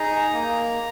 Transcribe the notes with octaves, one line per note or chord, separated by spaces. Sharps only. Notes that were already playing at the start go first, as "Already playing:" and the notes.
Already playing: D#4 G#4 A#5
A#3